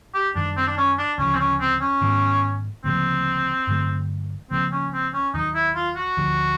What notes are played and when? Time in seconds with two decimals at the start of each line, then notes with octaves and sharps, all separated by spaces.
0.14 G4
0.35 F#2 D#3 G3 D4
0.56 C4
0.67 D4
0.77 C#4
0.98 D4
1.18 D2 C#3 F3 C#4
1.34 C4
1.39 C#4
1.60 C4
1.81 C#4
2.01 G#2 D#3 G3 B3
2.84 D2 C#3 F3 A#3 C4
3.67 G2 D3 F#3 A3
4.51 C#2 C#3 F3 A#3 C4
4.72 C#4
4.93 C4
5.14 C#4
5.34 D#2 D#3 F#3 D#4
5.55 E4
5.75 F4
5.97 F#4
6.17 D2 D3 F3